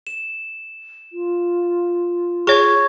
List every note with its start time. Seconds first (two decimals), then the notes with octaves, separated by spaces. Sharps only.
0.07 E7
1.13 F4
2.47 G#4 C#5 C#6 G#6